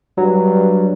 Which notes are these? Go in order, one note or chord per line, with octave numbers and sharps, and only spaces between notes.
G2 F#3